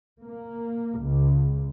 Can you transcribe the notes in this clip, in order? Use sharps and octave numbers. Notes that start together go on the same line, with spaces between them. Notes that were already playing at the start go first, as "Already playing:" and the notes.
A#3
C#2